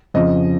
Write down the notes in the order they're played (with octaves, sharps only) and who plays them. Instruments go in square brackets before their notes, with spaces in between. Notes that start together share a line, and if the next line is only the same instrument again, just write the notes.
[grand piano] F2 C#3 F3 D#5